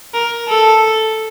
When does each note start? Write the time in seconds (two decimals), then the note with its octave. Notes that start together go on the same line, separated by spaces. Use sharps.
0.14 A#4
0.48 A4